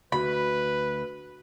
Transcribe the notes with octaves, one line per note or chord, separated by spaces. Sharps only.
D2 D3 A3 F#4 B4 B5